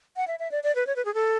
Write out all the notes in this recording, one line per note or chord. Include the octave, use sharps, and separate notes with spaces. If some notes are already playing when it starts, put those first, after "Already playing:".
F#5
E5
E5
D5
D5
B4
C#5
B4
G#4
A4